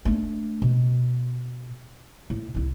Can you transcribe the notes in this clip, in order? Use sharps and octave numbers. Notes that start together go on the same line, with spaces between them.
A3 D4
B2
A2
C2 E4